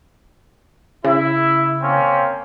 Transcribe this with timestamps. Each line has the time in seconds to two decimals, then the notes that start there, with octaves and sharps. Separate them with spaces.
1.04 C#3 E4
1.81 A#3 C4 C#4